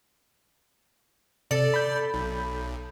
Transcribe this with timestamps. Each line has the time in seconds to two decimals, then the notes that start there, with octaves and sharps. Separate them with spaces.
1.51 C3 A4 D5
1.74 B5 G6
2.14 B1